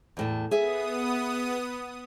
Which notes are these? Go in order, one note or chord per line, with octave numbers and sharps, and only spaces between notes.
E2 A2 A5
B3 G#4 E5 D#6